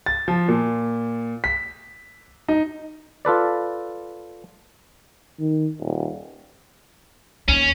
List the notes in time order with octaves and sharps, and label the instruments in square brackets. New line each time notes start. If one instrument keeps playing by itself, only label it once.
[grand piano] A6
F3
A#2
B6
D#4
[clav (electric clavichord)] F4 A4 B4 D5
[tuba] D#3
D#1
[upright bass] D#2 [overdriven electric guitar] C#4